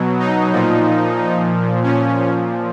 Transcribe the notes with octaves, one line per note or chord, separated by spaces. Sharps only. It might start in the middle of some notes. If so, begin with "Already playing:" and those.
Already playing: B2 F#3
D#4
A#2 F3
A#2 F3 C#4